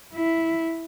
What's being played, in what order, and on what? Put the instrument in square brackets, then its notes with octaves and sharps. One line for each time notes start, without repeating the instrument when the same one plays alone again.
[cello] E4